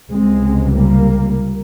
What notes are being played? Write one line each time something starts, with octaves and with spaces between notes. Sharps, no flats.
C#2 C3 G#3 C4
G3 A#3